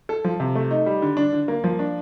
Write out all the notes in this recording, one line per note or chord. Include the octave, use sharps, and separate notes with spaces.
A4
F3
C3
A3
D#4
G3
D3
D4
D3
A#3
F3
D4